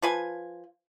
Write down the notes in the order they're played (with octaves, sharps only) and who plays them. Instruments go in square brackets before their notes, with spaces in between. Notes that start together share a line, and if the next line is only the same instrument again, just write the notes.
[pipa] F3 B4 G#5